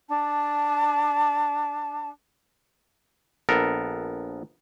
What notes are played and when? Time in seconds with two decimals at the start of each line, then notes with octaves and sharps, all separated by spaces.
0.09 D4 A5
3.49 A#1 B3 A4 A#4